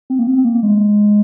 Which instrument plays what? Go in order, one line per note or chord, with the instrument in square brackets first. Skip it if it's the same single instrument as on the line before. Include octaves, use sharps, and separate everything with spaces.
[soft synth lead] C4
A#3
C4
A#3
G#3